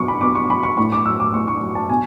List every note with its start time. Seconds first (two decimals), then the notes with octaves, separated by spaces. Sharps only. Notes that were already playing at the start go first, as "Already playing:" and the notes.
Already playing: B2 F#3 C#6 D6
0.08 B5
0.21 B2 D6
0.35 C#6
0.49 F#3 B5
0.63 C#6
0.77 A2 C#6
0.92 D6
1.05 F#3 E6
1.20 D6
1.34 A2 C#6
1.48 C#6
1.61 F#3
1.75 A5
1.89 B2 G#5